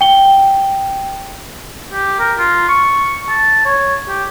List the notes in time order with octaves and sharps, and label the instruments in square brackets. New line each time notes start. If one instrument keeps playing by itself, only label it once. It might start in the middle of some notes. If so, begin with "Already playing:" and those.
[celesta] G5 G7
[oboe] G4
A#4
F4
C#6
A5
C#5
G4